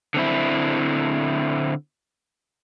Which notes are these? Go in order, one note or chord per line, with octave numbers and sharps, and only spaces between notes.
D3 C4 E4